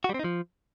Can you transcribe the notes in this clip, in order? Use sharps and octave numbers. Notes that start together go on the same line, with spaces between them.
F#4
G3
C4
D#4
F3